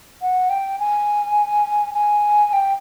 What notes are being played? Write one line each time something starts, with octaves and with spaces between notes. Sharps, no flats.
F#5
G5
G#5
G#5
G5